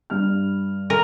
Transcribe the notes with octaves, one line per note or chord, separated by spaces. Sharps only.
G2 F6
A#4